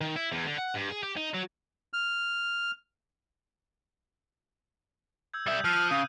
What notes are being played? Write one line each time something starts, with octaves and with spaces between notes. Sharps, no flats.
D#3
E4
E2
D3
F#5
G2
G#4
G4
D#4
F#3
F6
E6 G6 G#6
G3 E5 D#6 G6
F3 F6 F#6 D#7
C#3 D#6